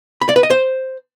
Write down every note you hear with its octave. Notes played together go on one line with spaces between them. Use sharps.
B5
D5
B4
D#5
C5